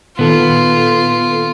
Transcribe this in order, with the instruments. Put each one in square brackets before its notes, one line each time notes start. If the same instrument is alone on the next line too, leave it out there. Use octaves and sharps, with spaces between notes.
[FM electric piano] A#2 D#3 A4 [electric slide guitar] B3 [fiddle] F4